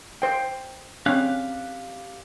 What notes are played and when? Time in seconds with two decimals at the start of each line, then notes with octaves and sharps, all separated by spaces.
0.22 C5 G5
1.06 C4 C#4 G4 F5 F#6